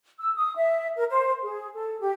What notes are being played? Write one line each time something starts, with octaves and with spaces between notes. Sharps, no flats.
E6
D#6
E5
A#4
C5
G#4
A4
G4